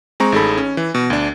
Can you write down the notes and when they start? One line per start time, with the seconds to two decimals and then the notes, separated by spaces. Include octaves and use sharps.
0.20 G#3 C4 A#5 C#6
0.32 A1 D#4 G#4 A4 B5
0.57 C#4
0.77 E3
0.95 B2
1.10 D2 D4